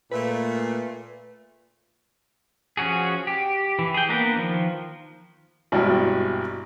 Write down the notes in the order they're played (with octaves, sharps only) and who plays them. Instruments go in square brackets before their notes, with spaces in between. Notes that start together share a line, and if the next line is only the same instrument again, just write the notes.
[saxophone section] A#2 A3 [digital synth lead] B4
[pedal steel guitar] F3 C#4 F#4 G#4
G4
E3
G#4 G5
A#3 B3 D4 A#4 B4
D#3 F3
[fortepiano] G#1 G2 B2 E4 D5